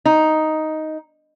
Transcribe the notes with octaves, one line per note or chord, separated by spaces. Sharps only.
D#4